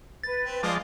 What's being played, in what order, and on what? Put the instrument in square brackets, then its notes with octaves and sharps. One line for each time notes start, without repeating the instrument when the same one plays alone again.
[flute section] B4 [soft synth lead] A6
[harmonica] C4
[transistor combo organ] F3 G#3 D5 [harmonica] D4 D#5 F5